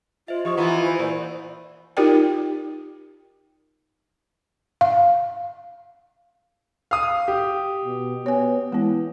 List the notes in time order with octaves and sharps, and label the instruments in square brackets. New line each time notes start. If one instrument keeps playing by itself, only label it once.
[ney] F4 [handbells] C5 D#5 E5
[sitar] F3 [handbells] G4 D#5 D#6 [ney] C#6
[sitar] E3 B3 [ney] F4 [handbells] F#5 A#5 B5
[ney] C5
[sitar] A#2 [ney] C5
[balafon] D#4 F4 G4 A#4 D5 G5
F5
[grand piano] F5 D#6
G4
[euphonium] B2
[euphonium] B3 [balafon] C#5 G#5
[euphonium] E3 [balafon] G#3 B3